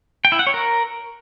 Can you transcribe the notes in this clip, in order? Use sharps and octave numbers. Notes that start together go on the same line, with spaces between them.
G5
E4
F#5
C#5
A#4